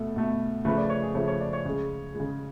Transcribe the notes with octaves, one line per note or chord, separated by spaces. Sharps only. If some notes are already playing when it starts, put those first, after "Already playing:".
Already playing: B2 A3 A4
B2 A3
C#3 F3 A3 B4
D5
C#5
G#4
C#3 F3 A3 C#5
C#5
D5
C#5
C#3 G#3
G#3
C#3